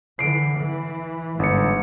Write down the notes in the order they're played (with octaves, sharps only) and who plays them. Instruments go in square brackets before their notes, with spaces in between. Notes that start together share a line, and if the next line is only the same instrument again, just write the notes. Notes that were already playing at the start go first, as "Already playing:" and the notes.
[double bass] D3 E3 [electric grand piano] C7 D7
[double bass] E3
[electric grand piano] G1 C#7 [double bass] G#2